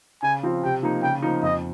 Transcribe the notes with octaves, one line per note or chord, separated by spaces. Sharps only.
C#3 G#5
F3 C4 F4
C3 G5
F3 A#3 D#4
C#3 G5
F3 A#3 D#4
F2 D#5